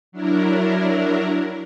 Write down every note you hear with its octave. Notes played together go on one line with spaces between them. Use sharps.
F#3 D4 E4 A#4